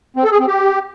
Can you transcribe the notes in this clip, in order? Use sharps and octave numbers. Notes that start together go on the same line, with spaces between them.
C4
A4
G#4
C4
G4